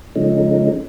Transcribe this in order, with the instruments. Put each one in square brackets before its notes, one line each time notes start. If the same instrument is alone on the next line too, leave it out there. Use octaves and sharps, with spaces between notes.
[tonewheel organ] C#3 F3 G#3 A3 C#4 D#4